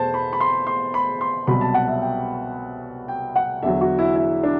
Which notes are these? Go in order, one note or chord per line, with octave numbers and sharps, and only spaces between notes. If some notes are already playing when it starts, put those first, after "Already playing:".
Already playing: E2 B2 A3 C5 A5
B5
B5
C6
C6
B5
C6
C2 B2 F#3 B5
A5
F#5
E5
G5
G5
F#5
E2 D3 F#3 E5
F#4
E4
E4
D4